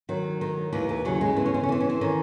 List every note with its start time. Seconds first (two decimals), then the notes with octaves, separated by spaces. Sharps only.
0.09 D#3 F#3
0.41 D#3
0.73 D#2 E3
0.89 E3
1.05 C#3 F#3
1.21 G#3
1.36 E3 C4
1.46 C#4
1.54 C4
1.63 C#4
1.69 E3 C4
1.80 C#4
1.90 C4
2.01 D#3 C#4